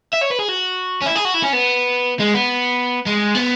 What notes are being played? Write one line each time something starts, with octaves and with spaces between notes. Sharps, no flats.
E5
C#5
B4
G#4
F#4
C#4
E4
G#4
F#4
E4
C#4
B3
G#3
B3
G#3
B3